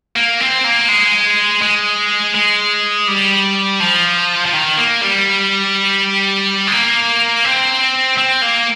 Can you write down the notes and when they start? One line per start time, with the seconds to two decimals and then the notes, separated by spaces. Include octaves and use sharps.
0.16 A#3
0.40 C4
0.64 A#3
0.89 G#3
1.62 G#3
2.35 G#3
3.07 G3
3.80 F3
4.46 F3
4.53 D#3
4.77 A#3
5.01 G3
6.67 G#3
6.72 A#3
7.45 C4
8.18 C4
8.42 A#3